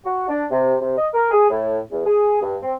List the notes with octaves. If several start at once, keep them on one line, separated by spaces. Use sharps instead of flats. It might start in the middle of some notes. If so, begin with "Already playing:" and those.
F#4
D4
C3
C3
D#5
A#4
G#4
A2
E2
G#4
G2
C4